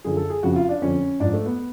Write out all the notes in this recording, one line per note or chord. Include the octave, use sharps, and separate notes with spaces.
F#2 D3 F3 G#4
A4
G#4
F2 C#3 F3 F#4
F4
D4
F2 D3 F3 C#4
G#2 F3 D4
A3
B3